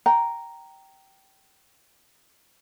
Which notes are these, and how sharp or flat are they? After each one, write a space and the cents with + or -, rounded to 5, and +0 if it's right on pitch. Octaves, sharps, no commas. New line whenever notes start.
G5 -15 A#5 +0